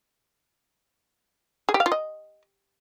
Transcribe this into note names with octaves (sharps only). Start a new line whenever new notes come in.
G#4
G4
F5
F4
D#5